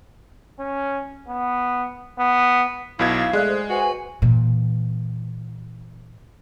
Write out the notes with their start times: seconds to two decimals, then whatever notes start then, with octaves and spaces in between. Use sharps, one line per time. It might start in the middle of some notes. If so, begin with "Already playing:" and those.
0.59 C#4
1.28 B3
2.19 B3
2.99 B1 B2 E4 F5 G#6
3.33 G#3 A3 G#4 D5 F#6
3.49 C5
3.70 F#4 B4 C5 G#5
4.22 A#2 E3